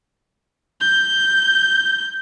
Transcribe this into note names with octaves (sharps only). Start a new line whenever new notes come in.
G6